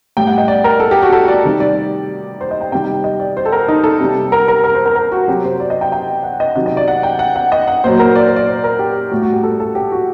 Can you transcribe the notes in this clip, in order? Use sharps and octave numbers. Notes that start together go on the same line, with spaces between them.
A2 G3 G5
F#5
D#5
D5
A#4
A4
G4
F#4
A4
D5
C3 D#3 G3
D5
C5
D#5
G5
C3 D#3 G3 G5
D#5
D5
C5
A4
A#4
D#4
A4
C3 G3
A#4
A#4
A#4
C5
A#4
A#4
F#4
C3 F#3 G4
C5
D5
D#5
G5
G5
F#5
D#5
C3 D#3 F#3 D#5
D#5
D5
F#5
G5
F#5
F#5
D#5
F#5
A#2 F#3 C5
A#4
D5
C5
D5
C5
A#4
G4
A2 G3 F#4
F#4
G4
A4
A4
G4
F#4